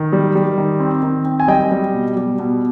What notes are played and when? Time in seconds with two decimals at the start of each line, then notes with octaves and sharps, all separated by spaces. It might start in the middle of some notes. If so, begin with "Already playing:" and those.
Already playing: D#3
0.12 G3
0.35 G3
0.58 D#3
0.80 C4
1.02 D#3
1.25 C4
1.40 G#5
1.48 G3 D#5 G5
1.71 G3
1.93 B2
2.16 G3
2.39 B2